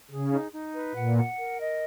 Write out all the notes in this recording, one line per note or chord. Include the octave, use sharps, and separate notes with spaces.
C#3 G#4
D#4
D#4
B4
A#2 F#5
F#5
A#4
D#5